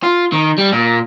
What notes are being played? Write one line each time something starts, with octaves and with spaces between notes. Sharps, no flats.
F4
D#3
G3
A#2